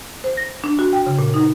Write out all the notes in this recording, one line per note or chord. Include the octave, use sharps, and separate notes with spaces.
C5
A#6
D4
F#4
G5
C#3
A#2
D#4